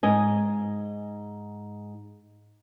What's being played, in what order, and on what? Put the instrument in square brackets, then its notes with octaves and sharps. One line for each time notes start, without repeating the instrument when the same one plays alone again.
[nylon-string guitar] G#2 D#5 G#5